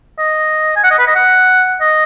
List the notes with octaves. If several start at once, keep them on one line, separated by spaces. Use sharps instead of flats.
D#5
G#5
F#5
D#5
B4
D#5
F#5
D#5